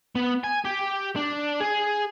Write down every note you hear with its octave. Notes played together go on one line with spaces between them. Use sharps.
B3
G#5
G4
D4
G#4